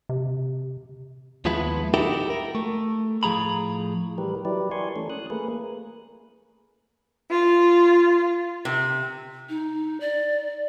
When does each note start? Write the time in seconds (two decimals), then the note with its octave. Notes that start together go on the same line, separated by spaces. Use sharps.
0.09 C3
1.45 D#2 F3 G#3 B3 E4 B4
1.94 D#4 E4 F#4 G4 A4 A#4
2.30 A#4
2.55 A3
3.23 A2 F3 G#4 A#5 B5
4.18 E3 G3 G4 A#4 B4
4.45 F#3 E4 G4 B4 D5
4.71 A#4 D5 G#5 C6 C#6
4.96 E3 A3 C#4 A4
5.10 D#6 F#6
5.30 A3 A#3 G#4 A#4 B4
7.31 F4
8.65 C3
9.49 D#4
10.00 D5